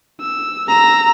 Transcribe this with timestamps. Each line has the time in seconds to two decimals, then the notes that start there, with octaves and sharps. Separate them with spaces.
0.21 E6
0.69 A#5 E6